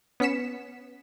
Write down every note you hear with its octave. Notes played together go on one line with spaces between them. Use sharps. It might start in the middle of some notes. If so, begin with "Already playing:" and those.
B3 C#4 B6 C#7 E7